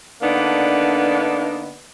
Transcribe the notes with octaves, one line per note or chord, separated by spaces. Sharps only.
D3 A#3 B3 D4 D#4